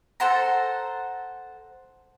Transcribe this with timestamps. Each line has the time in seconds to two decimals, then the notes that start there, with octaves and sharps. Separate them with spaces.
0.20 A4 C5 F#5 A#5